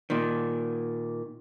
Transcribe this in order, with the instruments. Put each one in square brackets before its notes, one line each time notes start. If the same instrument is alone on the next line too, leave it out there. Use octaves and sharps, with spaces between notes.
[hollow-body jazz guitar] A#2 D#3